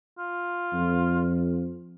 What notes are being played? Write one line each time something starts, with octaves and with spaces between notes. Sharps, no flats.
F4
F2